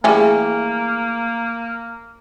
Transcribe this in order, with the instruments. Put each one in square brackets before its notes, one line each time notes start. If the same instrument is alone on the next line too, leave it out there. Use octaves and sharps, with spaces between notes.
[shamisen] E3 G3 C#4 [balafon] A3 G#4 [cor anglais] A#3